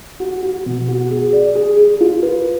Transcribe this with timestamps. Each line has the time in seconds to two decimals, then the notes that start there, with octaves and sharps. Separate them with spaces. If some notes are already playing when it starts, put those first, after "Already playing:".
0.20 F#4
0.43 F#4
0.66 B2
0.88 F#4
1.11 G#4
1.33 D5
1.55 G#4
1.77 G#4
2.01 F4
2.23 B4